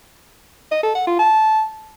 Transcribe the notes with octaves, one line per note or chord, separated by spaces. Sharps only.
D#5
A4
F#5
F4
A5